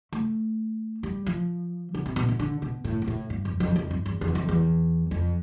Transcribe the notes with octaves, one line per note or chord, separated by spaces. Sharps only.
A3
G3
F3
D3
C3
B2
D3
D3
B2
A2
B2
A2
G2
F2
F2
F2
G2
E2
E2
F2
E2
F2